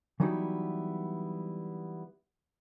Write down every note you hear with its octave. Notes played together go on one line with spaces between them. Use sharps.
E3 F#3 G3 B3 D#4 E4